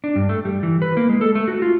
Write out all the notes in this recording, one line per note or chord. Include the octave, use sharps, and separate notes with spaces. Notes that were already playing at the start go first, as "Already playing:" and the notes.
D4
G2
A3
G3
E3
B4
A#3
G#3
A4
A3
F#4
F4